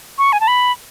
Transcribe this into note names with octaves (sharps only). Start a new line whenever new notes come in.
C#6
G#5
A5
B5